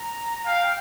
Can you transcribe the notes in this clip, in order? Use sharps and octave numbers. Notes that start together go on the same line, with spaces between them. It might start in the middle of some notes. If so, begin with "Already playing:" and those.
Already playing: A#5
F5 G5